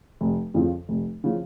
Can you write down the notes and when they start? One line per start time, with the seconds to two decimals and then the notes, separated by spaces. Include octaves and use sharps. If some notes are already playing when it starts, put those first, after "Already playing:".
0.21 F1
0.54 F2 C#3 F3
0.89 F1
1.24 C#3 F3